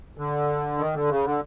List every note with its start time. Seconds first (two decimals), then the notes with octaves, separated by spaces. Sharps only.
0.18 D3
0.78 D#3
0.94 D3
1.09 C#3
1.24 D3